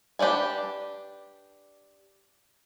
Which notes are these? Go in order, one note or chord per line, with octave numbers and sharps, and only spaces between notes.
D4 G4 B4 D5 G#5